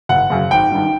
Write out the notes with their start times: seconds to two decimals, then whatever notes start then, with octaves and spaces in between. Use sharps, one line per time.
0.09 F#1 F#5
0.30 F#2 C#3
0.51 G#1 G5
0.72 G2 D#3